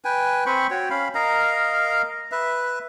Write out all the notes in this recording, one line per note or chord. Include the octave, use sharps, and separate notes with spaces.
B4 G5 G#5
C4 C5 B5 C#6
F#4 C#5 G5
C#4 F5 B5
A#4 D#5 F5 A#5
B4 E5